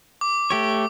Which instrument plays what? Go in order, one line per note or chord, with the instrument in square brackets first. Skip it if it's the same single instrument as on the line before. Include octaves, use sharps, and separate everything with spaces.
[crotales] D6
[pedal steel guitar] A3 G4 C#5